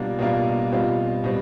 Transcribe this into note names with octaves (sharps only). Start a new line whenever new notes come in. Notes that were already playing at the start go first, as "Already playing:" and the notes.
Already playing: B2 G3 A#3 D4 F4
B2 G3 A#3 D4 F4
B2 G3 C4 F4
B2 G3 C4